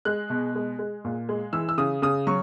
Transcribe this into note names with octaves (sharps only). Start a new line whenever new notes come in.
G#3 F#6
B2
G#3
G#3
A#2
G#3
E3 E6
E6
C#3 D#6
C#3 D#6
F#3 C#6